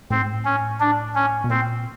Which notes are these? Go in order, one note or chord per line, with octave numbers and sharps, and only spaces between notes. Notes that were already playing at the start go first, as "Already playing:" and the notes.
A2 C4
G#2
A2
C#4
D4
C#4
B2
A#2 C4